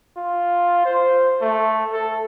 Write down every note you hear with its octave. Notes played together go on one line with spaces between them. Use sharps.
F4
C5
A3
A4